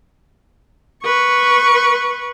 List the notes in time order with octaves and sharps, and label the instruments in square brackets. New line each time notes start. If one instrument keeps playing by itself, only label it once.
[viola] B4 C#6